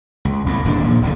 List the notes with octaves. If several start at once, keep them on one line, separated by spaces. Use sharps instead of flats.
C#2
C2 A2
D1 D#2 B2 D4
A#2 F3
D1 A#1 D3